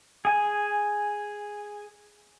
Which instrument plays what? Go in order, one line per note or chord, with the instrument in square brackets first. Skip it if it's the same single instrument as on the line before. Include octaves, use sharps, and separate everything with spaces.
[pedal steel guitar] G#4 G#5